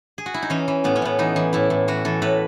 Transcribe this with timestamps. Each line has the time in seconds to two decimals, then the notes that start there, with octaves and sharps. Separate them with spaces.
0.18 G#4
0.26 F#4
0.34 E4
0.42 D#4
0.50 E3 C#4
0.68 E3
0.84 A2 B3
0.96 C#4
1.02 A2 B3
1.19 E3 D#4
1.36 E3
1.53 A2 E4
1.70 A2
1.88 E3 F#4
2.05 E3 A4
2.22 A2 B4